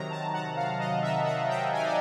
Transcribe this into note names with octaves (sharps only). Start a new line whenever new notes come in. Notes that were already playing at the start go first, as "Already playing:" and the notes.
Already playing: C3 D#3 F#3 A#5
A5
F#5
F5
D#5
E5
F#5
G5
G#5
D5